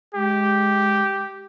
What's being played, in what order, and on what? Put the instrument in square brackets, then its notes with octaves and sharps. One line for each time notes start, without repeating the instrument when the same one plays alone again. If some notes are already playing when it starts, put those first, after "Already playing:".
[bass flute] G#3 [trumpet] G4